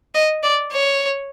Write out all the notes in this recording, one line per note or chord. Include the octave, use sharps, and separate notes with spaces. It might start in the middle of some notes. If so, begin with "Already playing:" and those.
D#5
D5
C#5